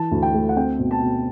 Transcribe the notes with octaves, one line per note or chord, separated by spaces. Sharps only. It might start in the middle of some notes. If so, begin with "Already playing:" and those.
Already playing: E3 A5
D2
G5
A3
F#5
C4 G5
B2
A5
B2